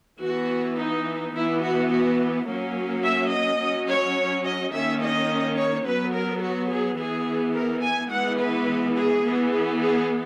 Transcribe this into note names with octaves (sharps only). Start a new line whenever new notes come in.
E3 B3 F#4
D#4
E3 B3 E4
F#4
F#4
F#3 A#3 C#4
E5
D#5
F#3 C#4
C#5
D#5
D#3 A#3 C#4 E5
D#5
C#5
F#3 B3 B4
A#4
F#4
G#4
E3 B3 G#4
A#4
G#5
E3 G#3 B3 F#5
B4
G#4
E3 B3
G#4
G#4